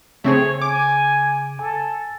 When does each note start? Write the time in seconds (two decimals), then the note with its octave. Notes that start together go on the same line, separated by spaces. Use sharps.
0.24 C#3 A3 C4 G#4 C#5
0.61 G#5 D6
1.59 A4 G#5